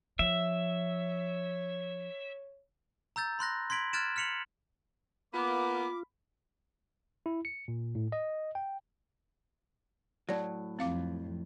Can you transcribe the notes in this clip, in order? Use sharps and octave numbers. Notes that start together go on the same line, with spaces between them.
F3 C#5 E5
A#5 E6 G6 A6
B5 C6 F#6 A#6
C6 G#6 B6 D7 F#7
F6 F#6 G#6 A6 D7 E7
F6 B6 C#7 F7 F#7
A#3 B3 F4 B5 D6
E4
C#7
A#2
A2
D#5
G5
A2 F#3 D5
F2 C4 F5 D6